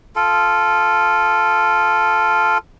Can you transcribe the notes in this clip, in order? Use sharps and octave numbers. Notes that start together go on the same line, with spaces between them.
F4 A4